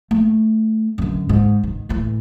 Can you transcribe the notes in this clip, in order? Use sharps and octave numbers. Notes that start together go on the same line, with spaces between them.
A3
F#2 D3
G#2
D#3
A2 E3